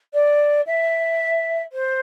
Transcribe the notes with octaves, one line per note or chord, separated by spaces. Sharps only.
D5
E5
C5